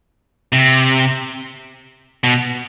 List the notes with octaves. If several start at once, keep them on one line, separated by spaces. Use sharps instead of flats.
C3
B2